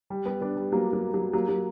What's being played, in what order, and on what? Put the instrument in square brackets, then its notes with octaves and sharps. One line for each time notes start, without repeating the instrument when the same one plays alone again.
[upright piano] G3
G3 B3
B3 D4
G3
F#3 A#3
F#3 A#3
F#3
F#3 A#3
F#3